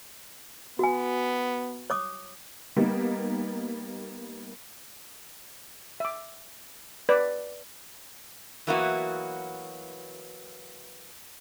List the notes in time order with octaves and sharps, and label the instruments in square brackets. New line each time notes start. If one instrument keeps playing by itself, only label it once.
[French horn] B3 [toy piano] F#4 G#5
[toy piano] C#5 D6 D#6
[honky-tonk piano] G3 A#3 B3 D#4
[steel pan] E5 D6
B4 D5
[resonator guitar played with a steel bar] E3 F#3 A#3 B3 E4 F#4